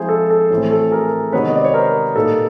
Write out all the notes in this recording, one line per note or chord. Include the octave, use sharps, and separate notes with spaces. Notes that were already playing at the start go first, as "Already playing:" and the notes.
Already playing: F3 G#3 C4 E4 G#4 C5
A4
A4
A2 E3 A3 C4
A4
G#4 A#4
C3 D#3 G#3 B3 B4 C#5
D#5
D5
C#5
A#4 C5
A#2 G3 A#3 D#4 A4 B4